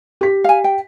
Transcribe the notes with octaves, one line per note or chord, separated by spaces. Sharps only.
G4 B6
F5 G#5
G5